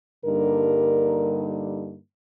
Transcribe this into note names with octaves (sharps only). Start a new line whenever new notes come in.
G2 D3 G3 A#3 D#4 A#4